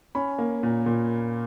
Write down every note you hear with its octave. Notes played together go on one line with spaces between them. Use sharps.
C#4 B5
A#3
A#2
A#2